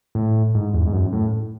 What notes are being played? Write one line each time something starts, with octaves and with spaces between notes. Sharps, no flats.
A2
G#2
E2
G#2
F#2
A2